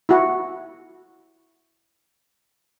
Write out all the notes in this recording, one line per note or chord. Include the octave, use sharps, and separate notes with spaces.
E4 F#4